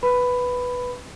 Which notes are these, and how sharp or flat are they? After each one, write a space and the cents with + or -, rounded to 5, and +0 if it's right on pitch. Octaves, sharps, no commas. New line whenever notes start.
B4 +0 B5 +10